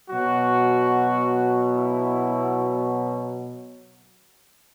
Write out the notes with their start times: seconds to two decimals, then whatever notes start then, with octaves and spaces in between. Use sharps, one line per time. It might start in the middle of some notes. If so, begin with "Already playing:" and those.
0.10 B2 F#3 F#4
1.77 E4